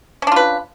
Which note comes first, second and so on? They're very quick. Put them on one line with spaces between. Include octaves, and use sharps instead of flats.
C#4 D4 F4 B4